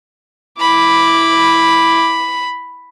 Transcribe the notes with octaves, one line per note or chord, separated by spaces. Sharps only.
E4 B5 D6